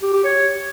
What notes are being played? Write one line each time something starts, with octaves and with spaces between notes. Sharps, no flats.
G4
G4
C#5